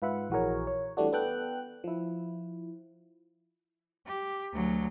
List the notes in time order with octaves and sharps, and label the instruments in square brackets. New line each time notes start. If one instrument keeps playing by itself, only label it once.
[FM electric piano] G#2 F4 B4 E5 F#5
A#1 E3 F#4 G#4 A#4 C#5
C#5
E3 G3 A3 D4 F#4
B3 A4 G5 F#6
F3 E4
[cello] G4
D2 F#3